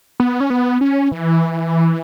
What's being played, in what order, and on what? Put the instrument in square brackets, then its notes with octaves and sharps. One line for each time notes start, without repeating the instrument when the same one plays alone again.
[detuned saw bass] B3
C#4
B3
C#4
E3